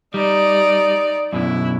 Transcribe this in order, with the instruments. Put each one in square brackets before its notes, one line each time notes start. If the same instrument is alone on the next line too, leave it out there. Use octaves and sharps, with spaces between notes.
[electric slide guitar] G3 [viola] D#4 D5
[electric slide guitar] F#2 B2 D3 [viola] E4